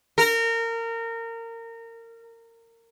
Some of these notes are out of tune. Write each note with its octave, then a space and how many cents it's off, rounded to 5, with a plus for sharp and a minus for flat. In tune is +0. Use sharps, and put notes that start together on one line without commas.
A#4 -25